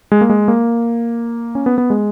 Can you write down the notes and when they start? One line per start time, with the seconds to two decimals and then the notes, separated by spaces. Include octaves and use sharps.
0.12 G#3
0.21 A#3
0.29 G#3
0.48 A#3
1.55 C#4
1.66 B3
1.78 B3
1.90 G#3